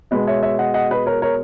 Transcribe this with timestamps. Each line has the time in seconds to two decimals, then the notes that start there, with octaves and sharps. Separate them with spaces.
0.11 B2 G#3 B3 B4 D#5
0.27 C#5 E5
0.43 C#5 E5
0.59 D#5 F#5
0.74 D#5 F#5
0.90 B4 D#5
1.06 A#4 C#5
1.22 A#4 C#5